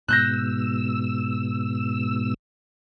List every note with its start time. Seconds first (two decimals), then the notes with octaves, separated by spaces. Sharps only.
0.08 G#2 B2 E6 F#6 G6 A#6